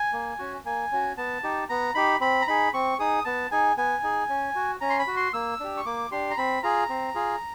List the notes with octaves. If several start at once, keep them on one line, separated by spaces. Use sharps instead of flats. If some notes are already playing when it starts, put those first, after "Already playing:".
Already playing: G#5
A#3
C#4 F#4
A#3 G#5
C#4 F#4
B3 A5
D#4 G4
B3 A#5
D#4 G4 B5
C4 B5
A#5
D#4 G#4 B5
C4 C#6
D#4 G#4 D#6
B3 A5
D#4 G#4 G#5
B3 G#5
D#4 G#4
C#4
F#4
C#4 A#5
C6
B5
F#4
C6
A#3 E6
D4 G4
C#6
A#3 D6
D4 G4 C6
A#5
C4 B5
F4 G#4 A#5
C4
F4 G#4